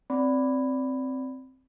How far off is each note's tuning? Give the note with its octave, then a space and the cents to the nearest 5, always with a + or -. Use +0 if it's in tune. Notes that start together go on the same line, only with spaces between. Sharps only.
C4 +0 D5 -15 B5 +10